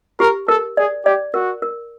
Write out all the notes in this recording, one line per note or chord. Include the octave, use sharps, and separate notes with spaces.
G4 A#4
A4 A#4
G#4 D5
G4 D5
F#4 A#4
A#4